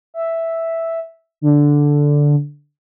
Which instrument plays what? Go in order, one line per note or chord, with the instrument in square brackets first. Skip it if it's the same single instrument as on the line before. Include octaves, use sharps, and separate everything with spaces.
[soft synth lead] E5
D3